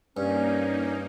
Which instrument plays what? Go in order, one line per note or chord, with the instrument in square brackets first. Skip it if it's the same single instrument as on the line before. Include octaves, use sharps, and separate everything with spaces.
[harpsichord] G2 [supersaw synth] A#3 D#4 [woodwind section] C#4 [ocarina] D5